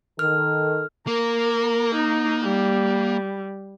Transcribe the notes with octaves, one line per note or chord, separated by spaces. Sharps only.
D#3 A4 F6
A#3 A#4
D#4
G3